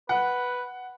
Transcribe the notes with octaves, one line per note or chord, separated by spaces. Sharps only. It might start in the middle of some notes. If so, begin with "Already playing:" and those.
B4 F#5